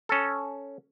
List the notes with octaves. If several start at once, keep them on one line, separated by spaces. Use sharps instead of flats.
C#4 A4